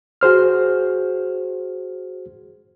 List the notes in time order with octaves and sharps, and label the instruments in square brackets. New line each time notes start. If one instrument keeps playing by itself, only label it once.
[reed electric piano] F#4 G#4 C5 F6